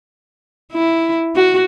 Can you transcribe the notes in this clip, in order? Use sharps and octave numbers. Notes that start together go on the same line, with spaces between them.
E4
F#4